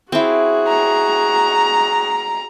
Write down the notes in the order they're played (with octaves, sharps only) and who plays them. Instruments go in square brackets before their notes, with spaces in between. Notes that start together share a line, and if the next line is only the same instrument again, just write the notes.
[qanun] C4 E4 [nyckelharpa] F#4 G#4
[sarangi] A#5